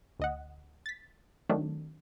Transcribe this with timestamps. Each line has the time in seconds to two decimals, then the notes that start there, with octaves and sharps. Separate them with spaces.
0.19 D2 D#5 F#5
0.86 A6 B6
1.49 D#3 F#3 A3 C4 D4